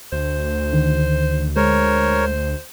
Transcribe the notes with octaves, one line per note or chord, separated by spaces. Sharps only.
D2 C5
D3 D#3
G#3 A#4 C5 C#5